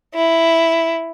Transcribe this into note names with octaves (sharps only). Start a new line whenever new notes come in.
E4